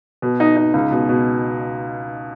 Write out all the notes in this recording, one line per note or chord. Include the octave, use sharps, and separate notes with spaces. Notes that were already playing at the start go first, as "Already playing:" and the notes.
B2
D#4
D#4
C#2
B2
B2